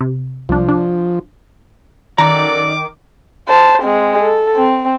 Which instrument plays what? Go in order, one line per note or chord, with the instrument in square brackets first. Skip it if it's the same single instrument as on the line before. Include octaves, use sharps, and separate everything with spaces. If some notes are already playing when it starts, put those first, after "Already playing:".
[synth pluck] C3
[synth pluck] C2 D4 [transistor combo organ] F3
[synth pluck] D4
[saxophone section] F#2 A4 D5 [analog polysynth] D#3 [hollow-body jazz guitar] A#5 [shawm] D6
[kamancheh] C5 A5
G#3 C4
A4
C4